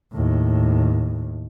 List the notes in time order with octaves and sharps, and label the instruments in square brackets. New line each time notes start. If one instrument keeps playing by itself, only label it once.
[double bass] D#2 A2